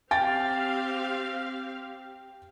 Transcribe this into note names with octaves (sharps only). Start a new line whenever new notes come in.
C4 G4 F5 G5 A6